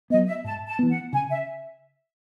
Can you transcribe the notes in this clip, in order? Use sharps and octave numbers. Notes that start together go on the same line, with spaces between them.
F#3 B3 D#5
E5
G#2 A5
A5
E3 B3
F#5
C#3 G#5
E5